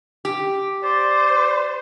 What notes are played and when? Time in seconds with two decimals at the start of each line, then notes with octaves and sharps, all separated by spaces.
0.25 G4
0.84 C5 D5